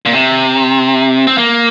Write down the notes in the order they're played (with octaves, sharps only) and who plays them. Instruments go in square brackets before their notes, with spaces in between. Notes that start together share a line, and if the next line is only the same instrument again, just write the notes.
[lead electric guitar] A#2
C3
C4
A#3